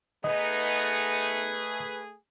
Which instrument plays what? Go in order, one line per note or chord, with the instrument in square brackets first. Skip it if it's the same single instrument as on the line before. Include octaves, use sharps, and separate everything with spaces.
[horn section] A3 G#4 [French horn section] B3 D#4 [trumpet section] B4 [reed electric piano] D#5